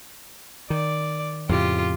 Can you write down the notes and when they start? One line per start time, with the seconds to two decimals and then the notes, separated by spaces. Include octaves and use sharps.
0.70 D#3 D5
1.49 F2 A2 C#3 F4 G4